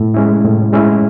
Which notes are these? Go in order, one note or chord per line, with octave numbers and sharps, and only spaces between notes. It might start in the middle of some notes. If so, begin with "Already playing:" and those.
Already playing: A2
G#3 C#4 E4
A2
G#3 C#4 E4